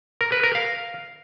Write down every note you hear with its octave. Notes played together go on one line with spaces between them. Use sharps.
A#4
B4
A#4
F5